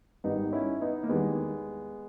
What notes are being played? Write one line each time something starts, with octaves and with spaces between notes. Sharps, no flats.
G#1 G#2 G3 B3 D#4
C#4 E4
B3 D#4
A#3
E2 D#3 G3 G#3 B3